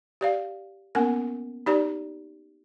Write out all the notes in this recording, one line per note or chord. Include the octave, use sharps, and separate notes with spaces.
G4 D5 F5
A#3 B3 C#4 A#4 F#5 G#5
D#4 G4 D5 A#5